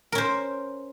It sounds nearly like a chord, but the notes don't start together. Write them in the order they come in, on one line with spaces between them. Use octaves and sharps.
A#4 C#4 C5